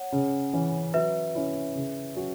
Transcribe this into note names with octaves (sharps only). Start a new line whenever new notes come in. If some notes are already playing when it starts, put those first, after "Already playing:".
Already playing: C#5 F#5
C#3
E3 C#4
F#3 B4 E5
C#4 E4
C#3
F#3 C#4 F#4